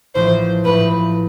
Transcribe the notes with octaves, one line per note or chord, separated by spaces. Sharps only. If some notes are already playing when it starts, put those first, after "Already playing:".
A1 A2 F3 C5
A1 A2 F3 B4